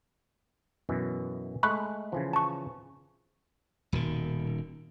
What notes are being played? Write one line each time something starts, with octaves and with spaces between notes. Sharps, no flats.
F#2 B2 E3
G#3 A3 B5 C#6 F#6
C#3 E3 F3
A5 C#6
D#1 B2 D#3